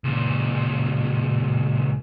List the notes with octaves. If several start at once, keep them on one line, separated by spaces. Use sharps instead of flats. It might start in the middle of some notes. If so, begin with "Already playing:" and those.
C#2 A#2